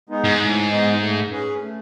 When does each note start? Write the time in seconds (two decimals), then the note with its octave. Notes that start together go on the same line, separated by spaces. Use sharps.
0.09 G#3 B3 D#4
0.24 G#2
0.39 A2
0.70 G#3 B3 D#4
1.00 A3
1.31 C#4 G#4 B4
1.60 A3